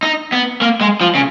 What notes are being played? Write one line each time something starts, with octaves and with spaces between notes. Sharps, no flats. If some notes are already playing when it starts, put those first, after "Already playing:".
D#4
B3
A#3
G#3
F3
C#3